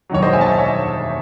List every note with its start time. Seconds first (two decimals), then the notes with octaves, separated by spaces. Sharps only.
0.09 E1 D#2 D#3 F#3 C#5
0.22 C5 D#5
0.33 E5 G#5
0.41 A5
0.46 E5 G#5
0.58 C#5 E5